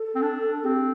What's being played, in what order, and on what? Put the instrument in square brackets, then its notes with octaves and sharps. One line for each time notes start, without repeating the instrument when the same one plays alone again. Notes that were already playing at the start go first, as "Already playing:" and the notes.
Already playing: [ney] A4
[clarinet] C4
D4
[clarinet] C4 [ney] G4